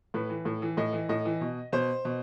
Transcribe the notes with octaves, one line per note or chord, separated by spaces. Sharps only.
A2 B4
E3
A2
E3
A2 D#5
E3
A2 D#5
E3
B2
B2 C5
B2